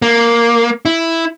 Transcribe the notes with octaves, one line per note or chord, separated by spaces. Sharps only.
A#3
E4